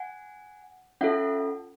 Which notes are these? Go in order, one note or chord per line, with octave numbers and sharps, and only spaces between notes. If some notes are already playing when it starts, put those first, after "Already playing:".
Already playing: F#5 G#5
C#4 F4 A4 E5 F#5